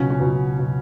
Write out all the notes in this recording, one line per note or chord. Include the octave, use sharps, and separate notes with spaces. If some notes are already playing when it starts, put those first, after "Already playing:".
Already playing: C#2 B2 F#3 C#4
C#4
C#2 B2 F#3
B2 F#3